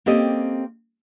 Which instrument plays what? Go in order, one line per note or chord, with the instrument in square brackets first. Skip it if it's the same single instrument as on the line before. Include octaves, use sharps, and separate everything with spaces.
[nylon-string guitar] A#3 C4 C#4 G4 A4 D#5